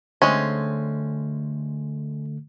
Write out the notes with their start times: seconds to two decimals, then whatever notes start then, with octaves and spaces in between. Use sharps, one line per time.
0.22 D3 G#3 A3 C4 C#4